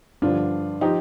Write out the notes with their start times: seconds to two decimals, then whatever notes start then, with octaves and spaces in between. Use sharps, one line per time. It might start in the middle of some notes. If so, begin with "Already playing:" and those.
0.22 G2 D3 F3 D4 F4
0.81 F3 D#4 G4